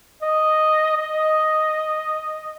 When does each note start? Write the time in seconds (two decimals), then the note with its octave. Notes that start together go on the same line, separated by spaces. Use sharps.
0.22 D#5
0.97 D#5